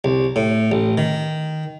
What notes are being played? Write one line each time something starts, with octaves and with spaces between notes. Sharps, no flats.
C2
A2
A1
D#3